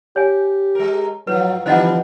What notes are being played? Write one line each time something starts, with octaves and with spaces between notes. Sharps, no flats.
G4 C#5 G#5
G#3 A#4
G#2 F3 F#3 B4
D3 E3 F3 G3 C4 C5 D#5 F#5